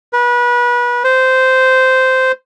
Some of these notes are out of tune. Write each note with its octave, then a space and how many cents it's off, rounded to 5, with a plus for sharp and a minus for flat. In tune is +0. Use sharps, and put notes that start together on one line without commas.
B4 -30
C5 -10